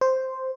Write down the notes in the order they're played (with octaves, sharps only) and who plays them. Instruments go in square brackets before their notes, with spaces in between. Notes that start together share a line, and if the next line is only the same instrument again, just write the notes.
[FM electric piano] C5